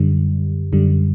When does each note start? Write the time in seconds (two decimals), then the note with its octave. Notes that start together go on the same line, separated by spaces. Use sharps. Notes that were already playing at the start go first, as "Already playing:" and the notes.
Already playing: F#2 D3 G3
0.73 F#2 D3 G3